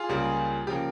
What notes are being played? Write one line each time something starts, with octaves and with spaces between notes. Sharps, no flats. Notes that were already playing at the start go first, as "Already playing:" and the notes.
Already playing: F4 G#4
C#2 C#3 G3 A#3
C#3 F3 A#3 G4